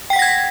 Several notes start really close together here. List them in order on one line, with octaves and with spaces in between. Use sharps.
G5 B6 F#5 A#6 G#6